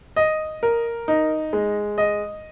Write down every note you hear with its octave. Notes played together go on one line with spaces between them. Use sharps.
D#5
A#4
D#4
G#3
D#5